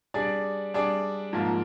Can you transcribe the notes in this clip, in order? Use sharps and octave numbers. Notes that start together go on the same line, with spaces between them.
G3 D4 G#4 D5
G3 D4 G#4 D5
G#2 F3 A#3 F4